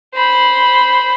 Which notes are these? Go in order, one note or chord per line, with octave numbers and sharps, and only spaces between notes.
C5 B5